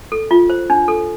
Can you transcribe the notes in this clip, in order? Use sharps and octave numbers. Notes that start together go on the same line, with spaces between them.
A4
F4
C5
D4
A4